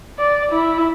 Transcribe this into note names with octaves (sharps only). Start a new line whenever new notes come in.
D5
E4